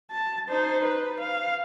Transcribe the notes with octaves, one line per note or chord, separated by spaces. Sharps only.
A5
D#4 C5
B4
F5